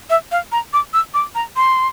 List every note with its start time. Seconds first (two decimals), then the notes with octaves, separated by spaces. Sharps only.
0.10 E5
0.32 F5
0.52 A#5
0.73 D6
0.94 E6
1.14 D6
1.35 A#5
1.56 C6